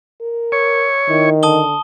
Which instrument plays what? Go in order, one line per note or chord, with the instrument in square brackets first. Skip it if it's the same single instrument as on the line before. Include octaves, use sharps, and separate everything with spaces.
[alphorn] A#4
[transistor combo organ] C#5
[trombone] D#3 [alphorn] E4
[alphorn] D3 [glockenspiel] A5 D#6 G7